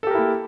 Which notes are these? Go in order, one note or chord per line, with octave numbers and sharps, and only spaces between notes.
A#3 E4 G4 A4 A#4